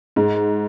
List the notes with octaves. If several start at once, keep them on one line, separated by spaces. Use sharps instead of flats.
G#2